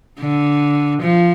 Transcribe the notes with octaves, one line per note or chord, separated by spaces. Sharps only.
D3
F3